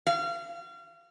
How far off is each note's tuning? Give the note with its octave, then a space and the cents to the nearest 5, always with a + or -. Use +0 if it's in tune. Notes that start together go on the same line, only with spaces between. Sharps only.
F5 -30